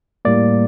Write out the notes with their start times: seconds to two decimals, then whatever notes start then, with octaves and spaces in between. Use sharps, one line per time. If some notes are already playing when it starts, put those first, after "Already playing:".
0.25 A2 G3 A#3 D5